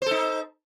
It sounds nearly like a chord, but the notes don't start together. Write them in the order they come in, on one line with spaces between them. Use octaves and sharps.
C5 A4 D#4